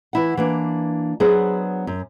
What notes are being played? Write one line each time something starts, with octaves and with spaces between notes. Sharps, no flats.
E3 E4 F#5
E3 A#3 D4
F#3 B3 D4 G#4 C5
F#2